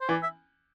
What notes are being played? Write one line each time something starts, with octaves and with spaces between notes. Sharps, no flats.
C5
E3 D5
E5